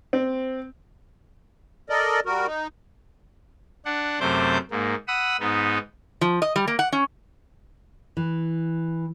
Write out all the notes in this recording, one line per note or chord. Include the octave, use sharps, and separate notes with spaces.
C4
A4 A#4 D5 D#5
G3 F#4 A#4
D#4
D4 F#5
F#2 C3 A3 C5 D6 G6
G#2 A#3
F#5 B5 D#6 E6
G#2 B3 D#4
F3
D#5
G3
A#3
F#5
C#4
E3